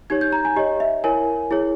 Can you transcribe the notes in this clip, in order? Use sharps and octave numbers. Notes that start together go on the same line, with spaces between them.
D#4 G4 C#5 G#6
G6
A#5
G#5
G4 C#5 D#5
E5
E4 A#4 C#5 G#5
E4 G#4 C#5